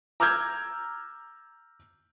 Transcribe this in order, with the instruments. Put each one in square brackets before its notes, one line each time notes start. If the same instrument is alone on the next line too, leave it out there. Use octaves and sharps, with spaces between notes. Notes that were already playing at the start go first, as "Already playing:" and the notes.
[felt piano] A#5 D6 E6 F6 G6 G#6